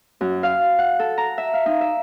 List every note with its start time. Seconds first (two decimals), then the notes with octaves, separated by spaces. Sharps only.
0.21 F#2
0.43 F5
0.79 F#5
0.99 A4
1.18 A#5
1.38 E5
1.53 F5
1.66 D#4
1.81 E5